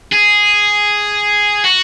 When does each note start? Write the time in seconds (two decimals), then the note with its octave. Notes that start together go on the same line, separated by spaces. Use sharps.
0.12 G#4
1.64 F#4